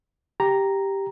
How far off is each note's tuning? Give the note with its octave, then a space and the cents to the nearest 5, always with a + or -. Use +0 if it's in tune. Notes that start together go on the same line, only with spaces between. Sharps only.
G4 +0 A#5 +0